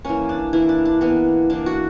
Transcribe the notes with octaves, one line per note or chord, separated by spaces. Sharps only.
E3 A#3 C#4
D4
E3 A#3 E4
D4
D4
E3 A#3 B3
E3 A#3 D4
F#4